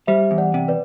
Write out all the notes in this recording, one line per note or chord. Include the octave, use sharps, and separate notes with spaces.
G3 C5 E5
E2
D5 F#5
C3
B4 D5